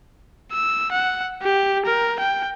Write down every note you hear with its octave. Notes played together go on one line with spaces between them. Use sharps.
E6
F#5
G4
A#4
G5